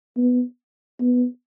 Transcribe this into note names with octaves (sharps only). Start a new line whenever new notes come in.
B3
B3